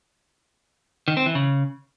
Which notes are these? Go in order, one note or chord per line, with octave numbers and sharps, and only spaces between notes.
D#3
C4
E3
C#3